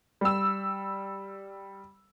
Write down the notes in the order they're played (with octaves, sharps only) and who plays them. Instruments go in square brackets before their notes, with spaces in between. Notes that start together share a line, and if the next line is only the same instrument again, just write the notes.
[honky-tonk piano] G3 E6